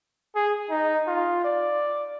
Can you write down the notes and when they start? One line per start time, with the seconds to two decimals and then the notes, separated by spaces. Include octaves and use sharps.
0.35 G#4
0.70 D#4
1.07 F4
1.44 D5